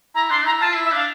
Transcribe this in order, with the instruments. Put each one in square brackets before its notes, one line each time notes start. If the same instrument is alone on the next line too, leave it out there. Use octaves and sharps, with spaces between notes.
[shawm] E4 [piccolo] A#5
[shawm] D4 [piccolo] C6
[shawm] E4 [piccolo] A#5
[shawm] F4 [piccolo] A5
[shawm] E4
[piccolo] E5
[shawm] D4 [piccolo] F5